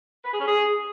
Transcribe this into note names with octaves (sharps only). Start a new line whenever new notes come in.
B4
G#4
C#4
G#4